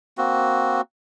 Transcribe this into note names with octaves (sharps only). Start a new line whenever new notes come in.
A#3 C4 F#4